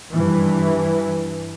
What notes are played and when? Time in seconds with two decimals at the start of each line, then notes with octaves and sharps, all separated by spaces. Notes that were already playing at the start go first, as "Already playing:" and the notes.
0.13 G2 E3